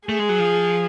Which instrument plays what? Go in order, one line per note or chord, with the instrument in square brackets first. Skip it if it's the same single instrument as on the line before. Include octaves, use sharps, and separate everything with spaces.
[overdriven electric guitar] A3 [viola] G#4
[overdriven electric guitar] G#3
F#3
F3